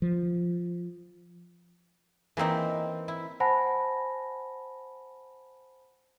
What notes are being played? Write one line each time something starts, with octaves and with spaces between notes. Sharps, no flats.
F3
E3 A#3 C4 D#4
E4
C5 F#5 G#5 A5 B5 A#6